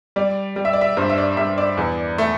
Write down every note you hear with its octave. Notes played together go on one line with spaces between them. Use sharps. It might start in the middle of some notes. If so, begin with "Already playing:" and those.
G3 D5
G3
E5
D5
E5
G2 C5
E5
D5
G2 E5
D5
E2
A3